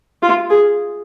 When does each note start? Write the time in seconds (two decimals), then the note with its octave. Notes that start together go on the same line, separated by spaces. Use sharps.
0.23 F4
0.50 G#4